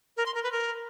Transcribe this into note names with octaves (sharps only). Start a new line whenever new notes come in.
A#4
C6
A#4
B4
A#4